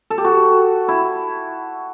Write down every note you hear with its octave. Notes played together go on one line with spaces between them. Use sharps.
A4
G4
F#4
E4